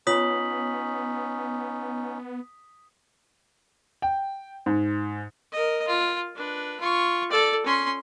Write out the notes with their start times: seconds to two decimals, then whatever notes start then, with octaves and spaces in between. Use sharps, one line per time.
0.07 B3 C#4 D#4 F4 C#5 D#6 B6 F#7
4.02 G5
4.66 G#2
5.52 A#4 D#5
5.87 F4
6.35 D4 B4
6.80 F4 C#6
7.31 A4 D5
7.65 C#4 C6